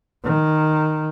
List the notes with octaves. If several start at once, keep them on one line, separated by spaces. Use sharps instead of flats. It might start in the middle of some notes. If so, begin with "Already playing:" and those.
D#3